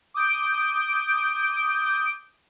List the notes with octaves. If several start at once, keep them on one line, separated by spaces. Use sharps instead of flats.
D6 D#6 G6 D7